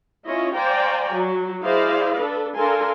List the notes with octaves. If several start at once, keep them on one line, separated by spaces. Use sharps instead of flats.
C#4 E4 F4 C#5 D#5
C5 D5 F5 G5 G#5 A#5
F#3
E4 G#4 C5 D5 D#5 F5
D4 A4 B4
D4 A4 A#4 F5 G#5 C6